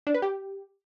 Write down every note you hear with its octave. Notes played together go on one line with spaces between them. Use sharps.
D4
B4
G4